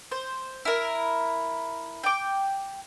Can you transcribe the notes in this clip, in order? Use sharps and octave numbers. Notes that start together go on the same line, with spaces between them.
C5
E4 A#4
G5 D6